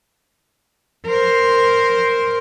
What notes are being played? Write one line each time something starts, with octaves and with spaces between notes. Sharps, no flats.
A#4 C5